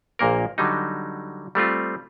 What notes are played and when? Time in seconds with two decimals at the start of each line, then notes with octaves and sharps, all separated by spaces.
0.19 A#1 A#2 A#3 A#4
0.58 D3 F#3 G3 D#4
1.55 G3 A3 C4 F4